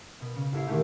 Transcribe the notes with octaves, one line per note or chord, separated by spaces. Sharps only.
B2
C#3
A1 A2 E4 C7
A#2 D#3 E3 G#3 A3 G4